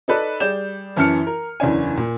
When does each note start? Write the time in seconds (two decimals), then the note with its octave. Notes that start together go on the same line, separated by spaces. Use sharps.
0.08 D#4 A4 B4 D5
0.40 G3 G#4 D5 G6 E7
0.96 F#2 E3 C#4 A5 F6 C#7
1.27 A#4
1.60 F#1 E2 C#4 D4 G#5
1.97 A#2